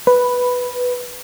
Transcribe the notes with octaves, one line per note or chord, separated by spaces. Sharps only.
B4